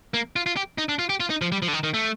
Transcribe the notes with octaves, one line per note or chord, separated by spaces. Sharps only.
A#3
F4
F4
G4
D#4
D4
F4
G4
F4
D#4
F3
G3
F3
D3
D#3
D#3
A3